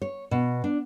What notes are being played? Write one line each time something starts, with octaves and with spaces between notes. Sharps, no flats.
C#5
B2
D4